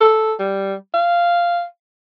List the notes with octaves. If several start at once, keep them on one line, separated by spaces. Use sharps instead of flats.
A4
G3
F5